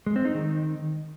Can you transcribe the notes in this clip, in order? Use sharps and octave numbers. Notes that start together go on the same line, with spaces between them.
G#3
C4
D#4
D#3